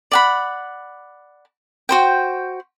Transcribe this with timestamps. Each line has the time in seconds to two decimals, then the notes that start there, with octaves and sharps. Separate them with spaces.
0.11 D5 F#5 B5
1.89 F#4 C5 G5